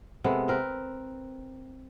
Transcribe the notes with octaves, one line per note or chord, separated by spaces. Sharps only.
C3 G#3 B3 A4
C4 A#4 B4